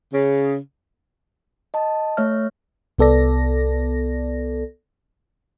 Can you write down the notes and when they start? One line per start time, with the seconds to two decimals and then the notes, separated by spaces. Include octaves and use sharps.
0.13 C#3
1.74 D#5 A5
2.17 A3 C#5 E5 F6
2.98 C2 B3 A4 D5 A#6